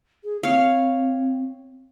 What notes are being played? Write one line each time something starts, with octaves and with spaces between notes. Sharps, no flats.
G#4
C4 C#5 F5